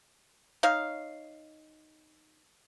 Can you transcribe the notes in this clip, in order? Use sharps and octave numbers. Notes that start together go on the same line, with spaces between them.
D#4 C#5 F5